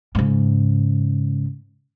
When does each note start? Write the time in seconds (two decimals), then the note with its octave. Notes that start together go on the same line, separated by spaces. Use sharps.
0.15 G#2 C#3